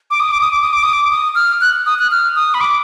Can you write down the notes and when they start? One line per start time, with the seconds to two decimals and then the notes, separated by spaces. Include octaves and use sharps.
0.11 D6
0.20 D#6
0.31 D6
0.41 D#6
0.51 D6
0.62 D#6
0.73 D6
0.83 D#6
0.93 D6
1.11 D#6
1.35 F6
1.61 F#6
1.86 D#6
1.99 F#6
2.11 F6
2.36 D#6
2.54 B5
2.61 D6